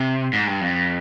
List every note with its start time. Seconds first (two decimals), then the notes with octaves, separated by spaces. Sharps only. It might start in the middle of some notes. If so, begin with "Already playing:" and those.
Already playing: C3
0.33 G#2
0.47 G2
0.61 F2